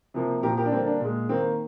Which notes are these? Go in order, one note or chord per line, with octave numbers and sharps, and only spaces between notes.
C3 F3 A#3
A#2 F3 A#3 G4 A#4
G4 A#4
D4
D3 G3 A#3 C4
D4
A#2 G#3
D#3 A#3 C4